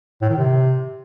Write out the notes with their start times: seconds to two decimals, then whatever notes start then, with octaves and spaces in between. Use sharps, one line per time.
0.21 A2
0.29 D#3
0.37 C3